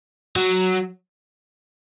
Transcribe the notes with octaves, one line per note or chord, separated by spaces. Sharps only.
F#3